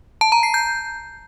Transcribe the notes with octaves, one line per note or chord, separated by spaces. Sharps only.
A5
A#5
C7
G6